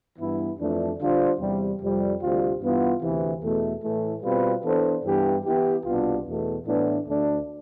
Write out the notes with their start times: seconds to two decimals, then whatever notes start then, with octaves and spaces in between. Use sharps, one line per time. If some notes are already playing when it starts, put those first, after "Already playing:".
0.18 G2 E3 B3 E4
0.59 F2 E3 A3 D4
0.99 D3 G3 D4 F4 C5
1.40 E2 C3 G3
1.81 F2 C3 G3
2.20 D2 C3 G3 C4 F4
2.61 G2 E3 B3 F4
3.02 D2 C3 E3
3.42 E2 B2 A3
3.83 A2 E3 A3
4.23 B2 G3 C4 F4 B4
4.64 E3 B3 D4 A4 C5
5.04 G2 E3 B3 E4 G4
5.44 E3 B3 E4 G4
5.85 C2 B2 B3 D4 F4
6.25 E2 B2 A3
6.66 A2 E3 B3 D4
7.07 D2 D3 A3 D4